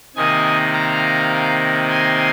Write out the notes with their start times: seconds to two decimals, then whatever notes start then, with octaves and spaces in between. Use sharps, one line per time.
0.16 C3 D#3 A#3 D#5 G#5
0.74 F5 A#5
1.89 G#5 C6